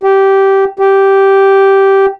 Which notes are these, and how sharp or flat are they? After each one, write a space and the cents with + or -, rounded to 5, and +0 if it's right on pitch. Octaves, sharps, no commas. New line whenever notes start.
G4 -15
G4 -10